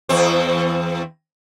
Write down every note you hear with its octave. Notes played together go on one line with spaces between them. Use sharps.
E2 C4